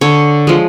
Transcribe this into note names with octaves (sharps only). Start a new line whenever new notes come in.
D3 C#5
F3 G#3